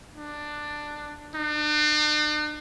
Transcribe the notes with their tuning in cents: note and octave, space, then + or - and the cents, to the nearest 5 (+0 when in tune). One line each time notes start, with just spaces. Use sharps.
D4 +10
D4 +45